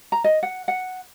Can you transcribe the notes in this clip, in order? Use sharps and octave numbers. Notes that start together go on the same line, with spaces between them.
A#5
D#5
F#5
F#5